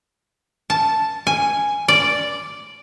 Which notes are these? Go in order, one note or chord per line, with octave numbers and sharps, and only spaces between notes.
A5
G#5
D5